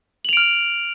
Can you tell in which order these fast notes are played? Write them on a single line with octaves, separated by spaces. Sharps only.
F#7 F7 D7 F6